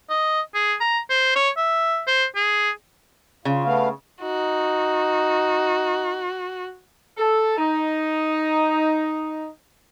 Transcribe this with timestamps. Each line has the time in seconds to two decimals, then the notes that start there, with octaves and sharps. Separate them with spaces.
0.10 D#5
0.55 G#4
0.81 A#5
1.10 C5
1.36 C#5
1.57 E5
2.07 C5
2.36 G#4
3.45 C#3 F4
3.65 A3 B3 F5
4.22 D#4 F#4
7.17 A4
7.58 D#4